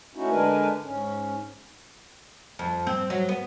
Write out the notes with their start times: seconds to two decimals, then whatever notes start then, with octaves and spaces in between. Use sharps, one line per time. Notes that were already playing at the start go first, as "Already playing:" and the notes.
0.15 A3 C#4 D#4 E4 F#4
0.30 D3 G#3 D4 A#4 B4 G#5
0.83 G#2 C#4
2.59 F2
2.87 C4
3.10 F#3
3.29 B3